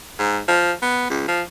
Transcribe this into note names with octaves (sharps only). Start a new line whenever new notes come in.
G#2
F3
B3
C#2
F3